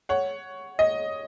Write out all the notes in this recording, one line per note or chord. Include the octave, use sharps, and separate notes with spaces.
C#5 F#5
D#5